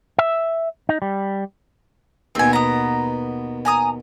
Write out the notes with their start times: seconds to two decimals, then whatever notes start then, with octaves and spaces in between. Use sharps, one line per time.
0.19 E5
0.89 D#4
1.02 G3
2.35 D#2 B2 C4 G#5
2.53 B3 A#5
3.65 G#5 A#5 D#6